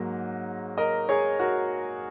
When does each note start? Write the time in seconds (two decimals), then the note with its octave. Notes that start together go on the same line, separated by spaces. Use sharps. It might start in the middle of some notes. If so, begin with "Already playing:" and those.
Already playing: G#2 F#3 A#3 D#4
0.78 A#4 D#5
1.09 G#4 C#5
1.39 F#4 A#4